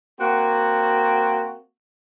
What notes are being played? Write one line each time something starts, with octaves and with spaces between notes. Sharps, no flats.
A#3 C4 F#4